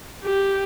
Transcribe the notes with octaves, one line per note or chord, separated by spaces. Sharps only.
G4